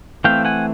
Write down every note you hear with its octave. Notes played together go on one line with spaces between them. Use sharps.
E3 A3 C4 F5 G5
F#5 G#5